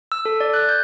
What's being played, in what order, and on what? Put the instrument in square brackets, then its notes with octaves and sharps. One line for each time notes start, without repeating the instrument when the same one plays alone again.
[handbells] E6
A4
D5
F#6
G6